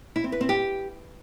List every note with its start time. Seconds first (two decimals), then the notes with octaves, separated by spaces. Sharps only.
0.16 E4
0.24 C4
0.32 B4
0.41 C4
0.49 G4